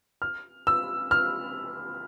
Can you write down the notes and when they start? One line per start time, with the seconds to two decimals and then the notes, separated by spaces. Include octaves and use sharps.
0.22 F6
0.67 E6
1.11 F6